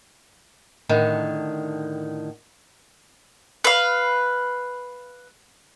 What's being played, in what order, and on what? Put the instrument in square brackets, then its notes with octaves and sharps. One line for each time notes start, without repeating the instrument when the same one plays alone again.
[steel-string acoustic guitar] A2 D3 D#3
[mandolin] B4 F5